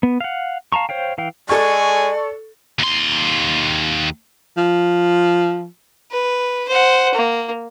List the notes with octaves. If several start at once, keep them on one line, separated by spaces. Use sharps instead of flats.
B3
F5 F#5
F5 A5 A#5 C#6
C5 C#5 F5 G5
E3 F5 G5
G#3 A4 D5 G#5 C#6
D#2 C6
F3
B4
C5 F#5
A#3